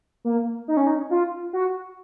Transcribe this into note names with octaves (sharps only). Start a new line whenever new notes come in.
A#3
D#4
C#4
D#4
F4
F#4